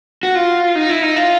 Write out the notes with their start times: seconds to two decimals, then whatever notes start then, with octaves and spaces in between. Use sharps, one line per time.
0.23 F#4
0.35 F4
0.75 D#4
0.89 E4
1.02 D#4
1.16 F4